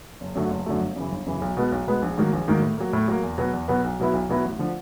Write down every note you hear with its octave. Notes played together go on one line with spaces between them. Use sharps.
F#1
F#2 D3 F#3 A3
F#1
F#2 D3 F#3 A3
G1
F#2 C#3 E3
G1
F#2 C#3 E3
B1
B2 G#3 B3
B1
B2 G#3 B3
A#1
G#2 D#3 F#3 A#3
A#1
G#2 D#3 F#3 A#3
A2
F#3 A#3
A2
F#3 A#3
E2
B2 F#3 B3
E2
B2 F#3 B3
B1
B2 F#3 B3 E4
B1
B2 F#3 B3 E4
A1
D3 F3